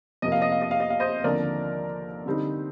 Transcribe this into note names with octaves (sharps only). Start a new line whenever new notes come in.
F2 C3 F3 A#3 D#5
F5
D#5
F5
D#5
F5
D#5
F5
C5 D#5
D#2 D3 F3 C4 A#4 D5
D3 G3 C4 D#4